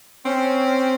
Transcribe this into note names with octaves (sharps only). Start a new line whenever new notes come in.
C4 C#4